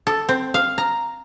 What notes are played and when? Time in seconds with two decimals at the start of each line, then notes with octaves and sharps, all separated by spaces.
0.07 A4
0.29 C4
0.54 F5
0.78 A#5